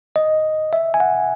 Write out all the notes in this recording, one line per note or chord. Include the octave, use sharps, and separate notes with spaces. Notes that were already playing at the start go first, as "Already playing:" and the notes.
D#5
E5
G#5
F#5